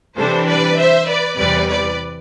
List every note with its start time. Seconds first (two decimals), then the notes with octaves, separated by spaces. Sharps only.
0.16 C3 E3 G3 D4 A4 C5
0.47 B4 D5
0.77 C5 E5
1.07 B4 D5
1.38 E2 C3 E3 G3 B4 D5
1.68 B4 D5